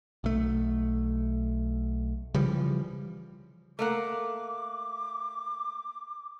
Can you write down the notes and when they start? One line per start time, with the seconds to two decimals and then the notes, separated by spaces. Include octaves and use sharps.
0.24 B1 A3
2.34 C#3 E3 F3 G3
3.79 A3 A#3 F#5 D6